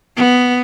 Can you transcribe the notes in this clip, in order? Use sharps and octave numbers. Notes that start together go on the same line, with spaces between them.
B3